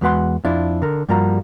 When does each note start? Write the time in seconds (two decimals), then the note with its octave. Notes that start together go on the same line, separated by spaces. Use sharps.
0.01 E2 G#3 F#4 B4 F#5 C6
0.45 F2 D4 E4 F4
0.82 D3 A#4
1.09 G2 F3 G3 A#3 F#4 A#5